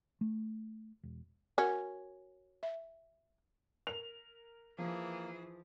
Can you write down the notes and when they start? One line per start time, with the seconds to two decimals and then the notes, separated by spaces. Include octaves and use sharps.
0.21 A3
1.03 E1
1.58 C#4 F#4 A#4 F#5
2.63 E5
3.87 A#4 F7
4.78 E3 F3 A#3 G#4